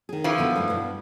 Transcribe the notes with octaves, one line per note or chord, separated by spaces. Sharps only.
D#3 G#4
E3 F3
B2 D3 B3
G2 G3 A3
G2 B2